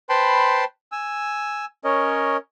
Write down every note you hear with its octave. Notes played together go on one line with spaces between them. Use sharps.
B4 C5 G5 A5 B5 C6
G#5 E6
C#4 A#4 C#5 D#5